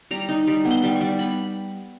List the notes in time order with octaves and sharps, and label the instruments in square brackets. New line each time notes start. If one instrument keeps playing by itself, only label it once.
[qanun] G3 A#5
D#4
G3
B3
C6
G3
C#6
G3
B3 B5